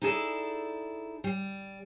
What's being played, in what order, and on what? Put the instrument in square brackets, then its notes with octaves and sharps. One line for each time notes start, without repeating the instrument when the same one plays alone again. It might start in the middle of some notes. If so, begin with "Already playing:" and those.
[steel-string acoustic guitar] D#4 E4 G#4 A4 D5
G3